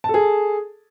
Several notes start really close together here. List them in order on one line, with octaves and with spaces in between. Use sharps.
A5 A4 G#4